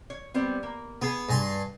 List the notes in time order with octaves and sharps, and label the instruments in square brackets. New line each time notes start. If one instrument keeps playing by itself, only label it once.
[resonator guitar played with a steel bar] C#5
G3 B3 C4
A#3
[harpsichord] B3 [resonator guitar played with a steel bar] G#4 B4
[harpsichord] G2 G#5 C6